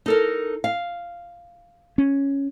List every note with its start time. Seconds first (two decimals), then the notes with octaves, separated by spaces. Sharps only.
0.06 D#4 A4 A#4
0.64 F5
1.98 C#4